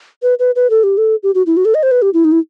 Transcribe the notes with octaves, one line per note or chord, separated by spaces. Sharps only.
B4
B4
B4
A4
G4
A4
G4
F#4
E4
F#4
A4
D#5
C5
B4
G4
E4
D#4
E4